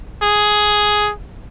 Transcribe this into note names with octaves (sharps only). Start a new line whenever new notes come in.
G#4